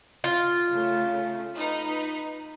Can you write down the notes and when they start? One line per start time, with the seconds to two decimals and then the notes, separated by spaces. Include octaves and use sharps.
0.24 F4
0.70 C#3 A3
1.56 D#4 B4